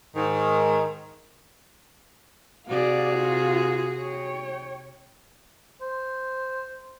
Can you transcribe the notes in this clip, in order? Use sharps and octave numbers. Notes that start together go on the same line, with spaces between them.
G#2 D#3
C3 F#4 G#4 D5 F5
F4
C#5 G5
C5